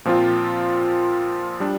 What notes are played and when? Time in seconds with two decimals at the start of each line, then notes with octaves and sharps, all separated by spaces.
0.05 A#2 F3 C4 F4
1.60 G3 D4